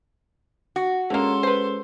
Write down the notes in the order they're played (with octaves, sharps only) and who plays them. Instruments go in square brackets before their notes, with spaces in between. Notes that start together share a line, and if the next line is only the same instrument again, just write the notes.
[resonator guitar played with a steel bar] F#4
[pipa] D3 A#3 [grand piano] G#3 C#4 [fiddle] A4 C6
[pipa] B4 C5